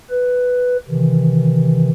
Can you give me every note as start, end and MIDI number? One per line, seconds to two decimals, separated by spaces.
0.10 0.77 71
0.88 1.90 48
0.88 1.90 51
0.88 1.90 52